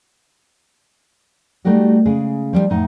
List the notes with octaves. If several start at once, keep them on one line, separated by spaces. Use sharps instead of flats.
G3 A3 D#4 F#4 G4
C#3 G#3 G#4
F3 G3 B3 D#4
F2 A2 D#4 F#5